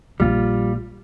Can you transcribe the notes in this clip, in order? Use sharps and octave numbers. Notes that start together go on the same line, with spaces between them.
A#1 G3 D4 F4